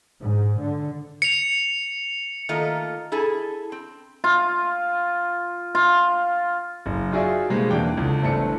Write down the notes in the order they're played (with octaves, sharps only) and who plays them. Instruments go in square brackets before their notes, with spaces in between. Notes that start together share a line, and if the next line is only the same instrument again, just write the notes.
[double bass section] G#2
D3
[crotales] C#7 F7
[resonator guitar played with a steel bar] D#3 A3 A#3 F4 D#5
E4 G#4 A4
C4
[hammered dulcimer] F4
F4
[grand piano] F#1
D#4 F4 F#4 G#4 D5 E5
B2 G3 G#3 A#3 C4 D#4
E2 E3 A#3 D4 G5 D6
C#2 D3
G1 E3 A3 C4 D4 C#7